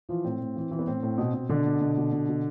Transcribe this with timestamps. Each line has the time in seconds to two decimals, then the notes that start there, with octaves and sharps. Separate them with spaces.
0.09 E3 F3 F4
0.24 A2 C4
0.40 A2
0.56 E3
0.71 E3
0.79 B3
0.87 A2 C4
1.03 A2
1.18 B2
1.34 B2
1.49 B2 D3 D4
1.66 B2
1.81 B2
1.97 B2
2.12 B2
2.29 B2